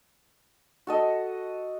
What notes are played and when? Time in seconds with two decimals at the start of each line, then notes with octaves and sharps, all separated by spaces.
0.87 F#4 A4 D#5